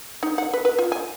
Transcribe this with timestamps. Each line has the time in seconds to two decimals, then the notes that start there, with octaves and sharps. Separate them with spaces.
0.23 D#4
0.38 F#5
0.54 B4
0.65 B4
0.79 F4
0.92 G#5